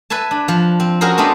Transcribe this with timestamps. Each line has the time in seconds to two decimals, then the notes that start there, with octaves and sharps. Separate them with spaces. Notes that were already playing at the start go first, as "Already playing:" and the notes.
0.10 B4 E5 G#5 A5
0.31 D4
0.48 F3
0.80 C4
1.01 C#4 F#4 G#4 A#4 C5
1.17 G#3 A3 B3 C4 D4